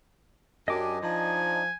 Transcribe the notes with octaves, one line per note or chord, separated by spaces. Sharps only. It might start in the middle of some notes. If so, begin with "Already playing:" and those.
F#2 D4 G4 D#5 G#5 D6
F3 D4 D#4 G#5